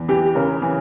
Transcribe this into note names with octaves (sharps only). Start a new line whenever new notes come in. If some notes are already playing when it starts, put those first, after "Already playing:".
Already playing: E2
E3 G4
C#3 A#4
E3